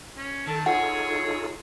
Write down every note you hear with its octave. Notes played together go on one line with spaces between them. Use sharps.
C#4
D#3 A4 A5
D#4 F4 G#4 A4 C#5 F#5